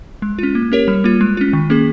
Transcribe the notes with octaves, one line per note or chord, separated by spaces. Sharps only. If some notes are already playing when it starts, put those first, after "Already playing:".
G#3
C#4 F4
A#3
C#4 G4 A#4 C#5
G3
A#3 F4
G#3
C#4 F4
D#3
A#3 C#4 G#4